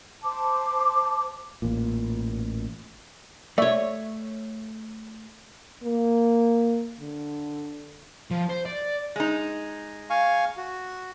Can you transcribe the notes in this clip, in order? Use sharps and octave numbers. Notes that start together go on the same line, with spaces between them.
C5 A5 D6
A1 A#2
A3 C#5 D5 E5 C#6
A#3
D3
F3
C5
D5
G#3 D#4
F5 G#5 C#6
F#4